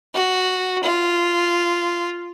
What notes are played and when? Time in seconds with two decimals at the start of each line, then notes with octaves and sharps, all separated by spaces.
0.14 F#4
0.83 F4